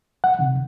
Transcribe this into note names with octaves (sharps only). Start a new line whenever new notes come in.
F#5
C3 D#3